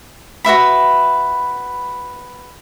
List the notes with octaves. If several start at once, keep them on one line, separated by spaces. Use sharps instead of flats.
F#4 B4 E5 B5